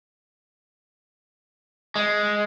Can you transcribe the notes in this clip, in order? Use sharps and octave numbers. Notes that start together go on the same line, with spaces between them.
G#3